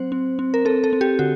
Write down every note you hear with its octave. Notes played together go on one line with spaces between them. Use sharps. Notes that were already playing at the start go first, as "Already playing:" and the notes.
Already playing: F#3 C4 C5
C4
C4
A#4
C4 A4
A4
C4
G4
D3 F#4